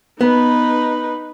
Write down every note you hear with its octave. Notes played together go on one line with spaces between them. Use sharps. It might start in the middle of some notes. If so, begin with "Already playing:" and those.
B3 D#4 B4